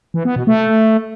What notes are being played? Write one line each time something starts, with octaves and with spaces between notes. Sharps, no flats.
E3
B3
B2
A3